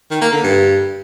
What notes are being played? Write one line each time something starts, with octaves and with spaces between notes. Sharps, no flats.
D#3
A#3
D3
G2